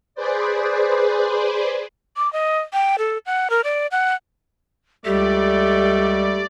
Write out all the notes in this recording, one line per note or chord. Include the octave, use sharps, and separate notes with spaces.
G#4 B4 C5 D5
D6
D#5
G5
A4
F#5
A#4
D5
F#5
C#2 G3 A3 G4 D5